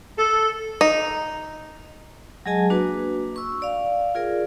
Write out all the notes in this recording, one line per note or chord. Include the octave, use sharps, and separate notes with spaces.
A4
D#4
F#3 G#3 G#4 D#5 G#5 A5
A#3 D4 F#4 B4
C#6 E6
D5 F5
F4 G#4 A#4 D5